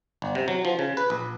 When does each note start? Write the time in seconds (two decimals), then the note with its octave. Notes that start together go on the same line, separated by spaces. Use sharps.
0.22 G1
0.35 C3
0.48 F#3
0.65 F3
0.79 C#3
0.97 B4
1.10 A#1